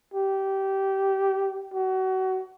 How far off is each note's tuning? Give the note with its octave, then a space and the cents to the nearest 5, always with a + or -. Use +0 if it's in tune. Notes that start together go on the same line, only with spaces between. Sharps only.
G4 -20
F#4 +30